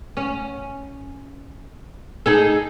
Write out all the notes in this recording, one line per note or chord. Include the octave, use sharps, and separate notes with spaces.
C#4
D#4 G#4 A4